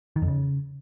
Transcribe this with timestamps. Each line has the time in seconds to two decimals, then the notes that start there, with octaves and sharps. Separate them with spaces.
0.16 D#3
0.22 F2
0.28 C#3